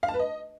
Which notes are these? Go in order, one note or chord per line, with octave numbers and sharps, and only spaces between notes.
F5
A5
B4
D#5